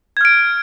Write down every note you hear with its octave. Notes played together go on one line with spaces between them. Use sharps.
F6 G#6 D7